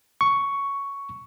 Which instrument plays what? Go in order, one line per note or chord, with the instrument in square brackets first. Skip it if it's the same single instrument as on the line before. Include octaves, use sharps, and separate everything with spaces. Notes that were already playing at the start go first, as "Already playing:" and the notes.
[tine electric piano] C#6